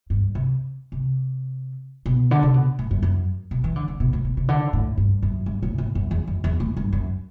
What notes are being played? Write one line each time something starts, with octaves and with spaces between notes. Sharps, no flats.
G2
C3
C3
B2
D3
C3
B2
A2
F#2
F#2
B2
E3
D3
D3
B2
A2
B2
C3
D3
A2
G2
F#2
G2
A2
A2
F#2
E2
F#2
E2
A2
G2
F#2